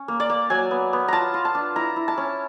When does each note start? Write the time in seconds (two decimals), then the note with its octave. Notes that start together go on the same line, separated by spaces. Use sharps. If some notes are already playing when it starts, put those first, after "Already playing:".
Already playing: C#4
0.08 A#3
0.20 D5
0.30 A#3
0.50 F#3 G#5
0.71 B3
0.93 B3
1.08 F4 A5 A#5
1.34 F4
1.45 A5
1.55 D4
1.76 E4 A#5
1.96 E4
2.08 A5
2.18 C#4